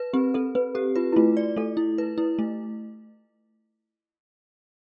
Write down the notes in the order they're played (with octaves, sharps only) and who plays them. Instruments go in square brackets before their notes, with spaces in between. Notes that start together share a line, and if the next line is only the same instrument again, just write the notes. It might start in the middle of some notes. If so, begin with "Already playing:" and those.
Already playing: [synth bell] B4
[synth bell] C4 [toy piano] G4
[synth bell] C4 [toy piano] A4
[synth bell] C4 [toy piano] B4
[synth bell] G4 [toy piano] A4
[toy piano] F4 [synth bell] B4
[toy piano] E4
[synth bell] A3 [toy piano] F4
[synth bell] D5
[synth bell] A3 [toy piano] A4
[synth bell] E4
B4
E4
A3